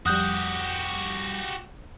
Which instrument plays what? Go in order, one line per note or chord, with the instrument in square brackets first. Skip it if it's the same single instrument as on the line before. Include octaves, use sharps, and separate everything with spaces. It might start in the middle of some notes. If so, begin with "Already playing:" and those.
[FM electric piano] F2 G3 [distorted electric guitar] F#4 G4 [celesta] D#6 F#6 G6